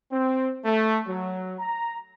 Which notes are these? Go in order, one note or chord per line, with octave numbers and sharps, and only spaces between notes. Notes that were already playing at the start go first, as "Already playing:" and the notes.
C4
A3
F#3
A#5